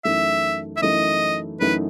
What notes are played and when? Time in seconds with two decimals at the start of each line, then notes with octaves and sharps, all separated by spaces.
0.05 F#2 E3 A3 D#4 E5
0.77 E5
0.82 F#2 E3 A3 D#4 D#5
1.60 F#2 E3 A3 D#4 B4